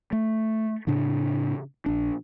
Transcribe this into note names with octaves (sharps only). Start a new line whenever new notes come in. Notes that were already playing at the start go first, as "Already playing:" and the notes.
A3
A2 C#3 D4
A#1 D4